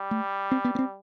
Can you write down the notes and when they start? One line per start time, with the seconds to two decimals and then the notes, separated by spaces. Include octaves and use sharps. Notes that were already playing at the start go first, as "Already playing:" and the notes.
Already playing: G3
0.11 A3
0.51 C4
0.64 B3
0.75 B3
0.79 C4